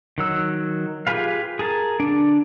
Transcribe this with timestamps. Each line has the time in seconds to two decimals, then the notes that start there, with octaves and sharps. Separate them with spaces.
0.18 D#3 F#3 E6
1.07 F4 G4 G#4 B4 F5
1.59 G#4 A#4 A5
2.00 D3 D4